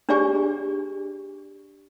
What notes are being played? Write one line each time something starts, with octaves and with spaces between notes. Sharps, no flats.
D4 G4 G#4 D5 G#5 C#6